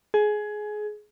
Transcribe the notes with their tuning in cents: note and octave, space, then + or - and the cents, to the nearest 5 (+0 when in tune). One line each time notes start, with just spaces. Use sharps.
G#4 +20